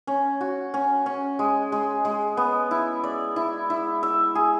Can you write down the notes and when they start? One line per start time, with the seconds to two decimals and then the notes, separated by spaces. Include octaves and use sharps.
0.07 C#4
0.41 F#4
0.74 C#4
1.06 C#4
1.39 G#3
1.72 G#3
2.05 G#3
2.37 B3
2.71 E4
3.04 D5
3.36 E4
3.70 E4
4.03 E5
4.35 G#4